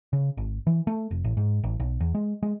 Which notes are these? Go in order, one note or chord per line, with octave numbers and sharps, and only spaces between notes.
C#3
G#1
E3
A3
F1
A1
G#2
A1
B1
E2
G#3
G#3